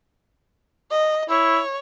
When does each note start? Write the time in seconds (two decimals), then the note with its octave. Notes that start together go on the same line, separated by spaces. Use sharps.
0.91 D#5
1.30 E4 C#5